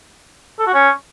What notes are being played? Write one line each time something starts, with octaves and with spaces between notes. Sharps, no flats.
A4
F#4
C#4